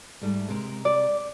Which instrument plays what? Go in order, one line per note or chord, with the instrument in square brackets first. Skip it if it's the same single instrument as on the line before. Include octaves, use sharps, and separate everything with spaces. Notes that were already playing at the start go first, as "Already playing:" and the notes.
[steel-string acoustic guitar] G#2 G3 A3
C3 G#3 A#4
[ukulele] D5